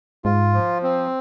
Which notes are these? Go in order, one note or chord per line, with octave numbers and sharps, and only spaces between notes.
G#2 F4
F3
C4